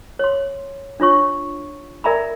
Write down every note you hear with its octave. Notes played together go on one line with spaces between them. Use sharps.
C#5 C6
D4 F4 C#5 C#6
A#4 D5 E5 G#5 A#5 B5